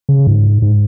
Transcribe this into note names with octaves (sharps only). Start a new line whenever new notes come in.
C#3
G#2
G#2